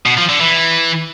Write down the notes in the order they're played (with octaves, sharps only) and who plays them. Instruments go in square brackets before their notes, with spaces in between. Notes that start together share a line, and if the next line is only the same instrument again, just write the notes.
[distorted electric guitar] B2
F3
D3
E3